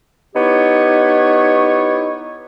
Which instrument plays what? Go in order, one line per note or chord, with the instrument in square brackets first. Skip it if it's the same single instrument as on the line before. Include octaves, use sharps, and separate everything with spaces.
[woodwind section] B3 D#4 E4 G4 C#5